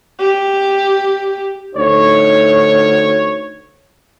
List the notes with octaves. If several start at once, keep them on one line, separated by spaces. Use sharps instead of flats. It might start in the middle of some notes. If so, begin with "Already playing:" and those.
G4
D2 D#4 C#5